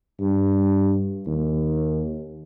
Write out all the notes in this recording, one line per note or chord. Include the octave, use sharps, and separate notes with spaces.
G2
D#2